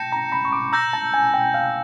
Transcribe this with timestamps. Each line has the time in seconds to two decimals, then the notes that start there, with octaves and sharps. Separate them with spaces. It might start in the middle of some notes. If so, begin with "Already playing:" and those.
Already playing: G5 A5 G6 A#6 C#7 E7
0.12 A#5
0.32 B5
0.45 C#6
0.53 D6
0.73 A#5 E6 G6 A#6
0.93 A5
1.14 G#5
1.34 G5
1.54 F5